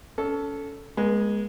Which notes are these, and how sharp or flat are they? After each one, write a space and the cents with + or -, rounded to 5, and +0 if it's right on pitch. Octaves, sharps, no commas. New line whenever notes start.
C#4 +25 A4 +0
G#3 +0 B3 -45